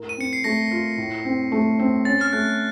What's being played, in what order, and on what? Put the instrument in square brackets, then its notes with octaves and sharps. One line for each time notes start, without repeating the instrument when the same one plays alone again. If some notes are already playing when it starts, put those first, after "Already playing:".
Already playing: [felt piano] A2 A#4
[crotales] D#7
[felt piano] C4 [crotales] C#7
[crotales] C7
[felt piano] A3 [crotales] A#6
[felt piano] F4
A2
C4
A3
C4
[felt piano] C#4 [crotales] A6
[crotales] F6
[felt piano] A3 [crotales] F#6